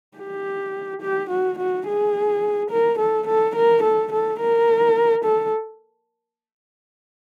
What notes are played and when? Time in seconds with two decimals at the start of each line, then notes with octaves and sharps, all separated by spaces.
0.18 G4
1.02 G4
1.30 F#4
1.59 F#4
1.87 G#4
2.71 A#4
2.99 A4
3.27 A4
3.55 A#4
3.83 A4
4.12 A4
4.40 A#4
5.24 A4